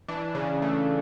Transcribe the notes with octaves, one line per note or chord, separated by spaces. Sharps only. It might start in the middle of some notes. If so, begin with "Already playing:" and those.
E3 D4
C#3
A3